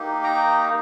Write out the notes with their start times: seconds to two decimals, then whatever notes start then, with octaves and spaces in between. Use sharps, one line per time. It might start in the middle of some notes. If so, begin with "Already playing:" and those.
Already playing: A#3 D#4 G4
0.23 G5 A#5